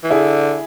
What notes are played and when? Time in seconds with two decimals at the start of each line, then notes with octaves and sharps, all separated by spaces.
0.04 E3
0.10 D3 E4 G#4